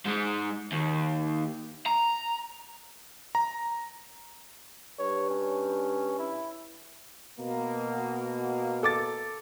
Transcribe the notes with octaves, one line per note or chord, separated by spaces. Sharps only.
G#2 G#3
D#2
A#5
A#5
G2 C#5
C#4
E4
B2 A#3
A4 D6 A6